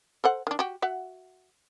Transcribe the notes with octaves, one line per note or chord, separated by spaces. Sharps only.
A4 C5 F#5
D#3 D4
F#4 G4
F#4 E5 F#5